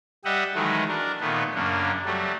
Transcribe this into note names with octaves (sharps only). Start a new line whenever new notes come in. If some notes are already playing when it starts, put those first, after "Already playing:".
G3 G4 D#5 E5 F#5
D#3 E3 F#3 G#3 A3 E4
D4 A#4
A#2 D#3 A3 B3
F#2 C#3 A#3 D4
F#3 G3 A3